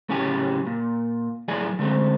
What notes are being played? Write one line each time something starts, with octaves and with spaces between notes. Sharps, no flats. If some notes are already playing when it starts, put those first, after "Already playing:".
A2 C#3 F#3 G4 G#5
A#2
A2 F#3 G#4 D5 G#5
D3 G#3 A3 C4